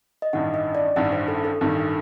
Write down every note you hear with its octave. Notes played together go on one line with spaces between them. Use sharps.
D#5
A1 G2 D#3 F#5
D#5
D5
A1 G2 D#3 F#5
C5
A4
A4
A1 G2 D#3